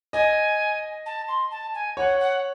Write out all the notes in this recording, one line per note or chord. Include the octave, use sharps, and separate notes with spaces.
D#5 G#5
A5
C6
A5
G#5
C#5 F#5
F#5